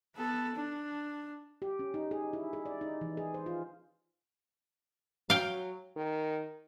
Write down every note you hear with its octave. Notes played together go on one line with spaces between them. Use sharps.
B3 A4
D4
G4
C#4
D#4
G#4
E4
G#4
D5
D#4
E3
G#4
C5
F4
F#3 F5 G5
D#3